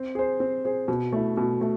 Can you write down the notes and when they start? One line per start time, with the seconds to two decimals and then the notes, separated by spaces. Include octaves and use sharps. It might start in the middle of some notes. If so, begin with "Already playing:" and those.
Already playing: C4
0.15 G#4 C5
0.40 C4
0.64 G#4 C5
0.88 B2
1.13 A3 E4
1.37 B2
1.61 A3